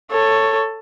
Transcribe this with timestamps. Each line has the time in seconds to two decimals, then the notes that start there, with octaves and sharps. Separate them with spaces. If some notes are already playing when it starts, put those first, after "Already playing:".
0.11 A4 C#5